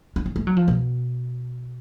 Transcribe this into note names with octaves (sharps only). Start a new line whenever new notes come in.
D4
C#4
A3
F#3
F3
B2